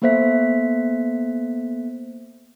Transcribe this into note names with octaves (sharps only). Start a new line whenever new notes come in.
A#3 B3 A4 C5 E5 B6